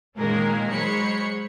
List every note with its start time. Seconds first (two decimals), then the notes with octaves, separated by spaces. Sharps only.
0.18 A#2 D#3 G#3 A#3 C#4 A#4
0.70 F#3 G#3 C5 C#5 B5 C#7